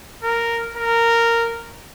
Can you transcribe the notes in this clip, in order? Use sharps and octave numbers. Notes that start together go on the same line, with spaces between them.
A#4
A#4